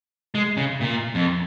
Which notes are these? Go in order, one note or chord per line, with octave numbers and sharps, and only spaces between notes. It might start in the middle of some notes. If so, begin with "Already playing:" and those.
G#3
C#3
A#2
F2